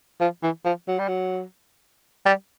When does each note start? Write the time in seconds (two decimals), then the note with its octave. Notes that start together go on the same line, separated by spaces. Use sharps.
0.21 F3
0.43 E3
0.65 F3
0.88 F#3
0.99 G3
1.08 F#3
2.25 G3